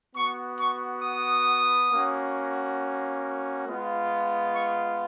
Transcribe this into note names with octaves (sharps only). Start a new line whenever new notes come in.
B3 F#4 C#6
C#6
D#6
A#3 C#4 F#4
G#3 B3 F4
C#6